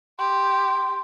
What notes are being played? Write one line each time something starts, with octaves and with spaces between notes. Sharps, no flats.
G4 C6